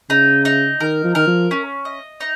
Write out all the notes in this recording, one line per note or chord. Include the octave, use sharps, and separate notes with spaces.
C#3 D#4
D#4
D#3 A#4
F3
D#3 A#4
F3
C#4
D#5
D#4